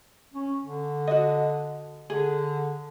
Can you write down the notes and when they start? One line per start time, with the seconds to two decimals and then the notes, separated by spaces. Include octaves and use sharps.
0.34 C#4
0.62 D3
1.07 F#4 D#5
2.10 D3 G#4